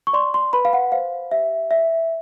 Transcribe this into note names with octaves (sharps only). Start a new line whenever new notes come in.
C#6
D5 C6
C6
B4 B5
F5
F#5
C5 F5
G4 E5
D5 E5